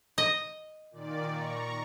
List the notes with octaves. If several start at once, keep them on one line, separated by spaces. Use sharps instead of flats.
D#5
A#2 D#3 D5
A#5 C#6